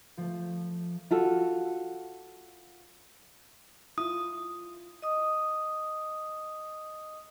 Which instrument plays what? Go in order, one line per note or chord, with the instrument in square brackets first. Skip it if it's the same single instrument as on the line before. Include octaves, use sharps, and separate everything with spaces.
[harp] F3 A3
[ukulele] F4 F#4 A4
[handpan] E4 F4 [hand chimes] D#6
[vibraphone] D#5 D#6